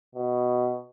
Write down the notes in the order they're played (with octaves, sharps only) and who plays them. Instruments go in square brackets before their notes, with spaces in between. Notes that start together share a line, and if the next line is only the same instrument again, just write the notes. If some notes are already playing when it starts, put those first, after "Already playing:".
[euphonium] B2